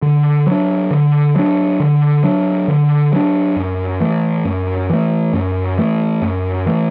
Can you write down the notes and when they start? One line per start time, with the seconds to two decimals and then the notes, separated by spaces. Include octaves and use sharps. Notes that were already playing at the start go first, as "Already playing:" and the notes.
0.02 D3
0.47 F#3 D4
0.91 D3
1.36 F#3 D4
1.80 D3
2.24 F#3 D4
2.68 D3
3.13 F#3 D4
3.56 F#2
4.00 E3 A3
4.45 F#2
4.90 E3 A3
5.33 F#2
5.78 E3 A3
6.22 F#2
6.66 E3 A3